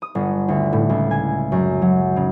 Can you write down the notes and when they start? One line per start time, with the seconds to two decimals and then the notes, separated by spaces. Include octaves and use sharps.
0.02 D#6
0.15 G1
0.48 D2
0.73 A2
0.89 C#2
1.11 G#5
1.52 F#2
1.82 F#3
2.16 C#3